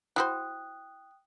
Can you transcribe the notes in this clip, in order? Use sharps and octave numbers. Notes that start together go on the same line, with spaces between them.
E4 F#4 C5 G5 D#6 F#6